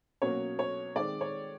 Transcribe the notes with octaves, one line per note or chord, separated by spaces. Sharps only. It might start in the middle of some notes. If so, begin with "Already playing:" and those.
B2 F#3 A#3 C#4 C#5
C#5
D#3 G#3 C4 D5
C#5